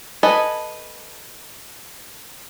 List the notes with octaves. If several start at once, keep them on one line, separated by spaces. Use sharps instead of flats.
A4 B4 D#5 G#5